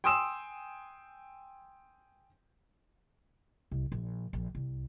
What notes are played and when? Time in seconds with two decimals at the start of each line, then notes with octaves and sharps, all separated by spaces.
0.04 G5 G#5 C6 D#6 E6 E7
3.71 C2
3.92 A#1
4.33 A#1
4.55 C2